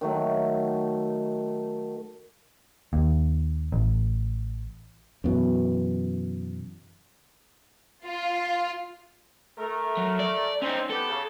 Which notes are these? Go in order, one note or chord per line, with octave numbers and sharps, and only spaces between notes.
D#3 F#3 A3
D#2
A1
F#2 B2 E3
F4
A3 A#4
F#3
D5
C4 C#4 D#4
B3 G4 A4
C#3